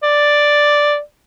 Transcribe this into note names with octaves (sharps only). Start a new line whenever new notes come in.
D5